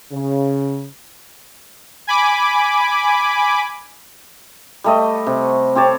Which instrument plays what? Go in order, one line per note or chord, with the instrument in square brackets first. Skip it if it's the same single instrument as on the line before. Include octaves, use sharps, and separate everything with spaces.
[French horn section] C#3
[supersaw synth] G#5 B5 D6
[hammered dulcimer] G3 A3 D#5
C3
C4 G4 C#5 A5